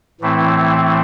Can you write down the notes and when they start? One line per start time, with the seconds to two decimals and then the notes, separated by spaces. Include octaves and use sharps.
0.21 A2 E3 A3 C4 E4